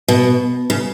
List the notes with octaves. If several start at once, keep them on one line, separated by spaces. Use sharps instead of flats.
B2
C#3